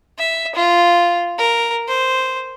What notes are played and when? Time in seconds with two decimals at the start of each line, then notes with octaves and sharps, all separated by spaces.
0.18 E5
0.56 F4
1.39 A#4
1.88 C5